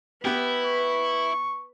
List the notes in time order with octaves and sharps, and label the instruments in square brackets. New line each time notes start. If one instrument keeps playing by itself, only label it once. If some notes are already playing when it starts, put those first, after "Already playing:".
[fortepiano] B3 G4 [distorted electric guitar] E4 [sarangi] B4
[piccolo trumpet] C#6